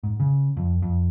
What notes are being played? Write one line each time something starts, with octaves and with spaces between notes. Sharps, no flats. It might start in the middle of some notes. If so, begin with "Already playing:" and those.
G#2
C#3
F2
F2